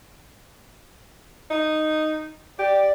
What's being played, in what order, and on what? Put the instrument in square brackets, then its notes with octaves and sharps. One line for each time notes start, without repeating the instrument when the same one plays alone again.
[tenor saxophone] D#4
[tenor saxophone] G4 [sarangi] D5